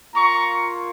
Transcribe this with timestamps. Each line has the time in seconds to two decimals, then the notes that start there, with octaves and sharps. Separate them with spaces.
0.14 A#3 F4 A#5 C#6